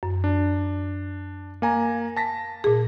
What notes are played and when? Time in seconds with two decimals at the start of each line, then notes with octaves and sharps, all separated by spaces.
0.03 F#2
0.24 D4
1.62 A#3 G#5 A#5
2.17 A5 A#6 B6
2.64 A#2 G#4